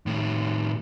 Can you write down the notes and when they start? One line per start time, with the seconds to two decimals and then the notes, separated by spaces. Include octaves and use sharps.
0.06 A2 D#3